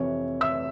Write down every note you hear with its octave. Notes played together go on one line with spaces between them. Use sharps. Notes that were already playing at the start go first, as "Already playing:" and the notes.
Already playing: F2 C3 E3 C#5
E5 E6